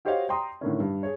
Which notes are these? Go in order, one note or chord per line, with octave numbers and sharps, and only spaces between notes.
F#4 G4 C5 C#5 D#5 F5
G5 A#5 C6 D#6
A2 D3 D#3 C#4
G2
G#4 C#5